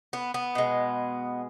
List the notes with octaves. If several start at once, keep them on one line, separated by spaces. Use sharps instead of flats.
B3
B3
B2 G#3